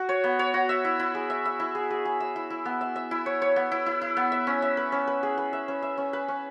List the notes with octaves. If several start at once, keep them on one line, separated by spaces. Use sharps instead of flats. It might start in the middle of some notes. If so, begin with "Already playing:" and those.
Already playing: F#4
C#5
B3
C#5
F#4
E5
E4
E4
G#4
E5
E5
E4
G#4
G#4
G#4
E5
E4
E4
B3
E5
E5
E4
C#5
C#5
B3
E4
E4
E4
B3
E5
C#4
E5
B4
C#4
B4
G#4
B4
E5
C#4
E5
C#4
B4
C#4